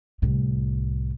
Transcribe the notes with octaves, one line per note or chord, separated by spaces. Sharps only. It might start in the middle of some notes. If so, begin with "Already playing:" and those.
C2 A2